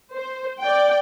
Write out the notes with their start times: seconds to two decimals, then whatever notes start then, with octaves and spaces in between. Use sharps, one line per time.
0.14 C5
0.62 D5 G5